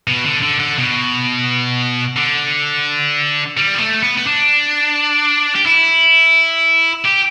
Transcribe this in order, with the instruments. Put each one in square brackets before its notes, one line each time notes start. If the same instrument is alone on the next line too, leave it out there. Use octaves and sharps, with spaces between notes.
[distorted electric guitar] B2
D3
D3
D3
B2
D3
G3
B3
A3
B3
B3
D4
G4
E4
G4